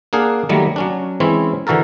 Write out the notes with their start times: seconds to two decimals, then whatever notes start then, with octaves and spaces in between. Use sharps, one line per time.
0.13 A#3 D4 G#4 F5 F#5
0.49 D#3 F#3 G3 A3 A#3
0.76 F#3 C#4 D4
1.20 E3 G#3 C4 C#4 E4
1.67 D3 E3 F#4 A4 A#4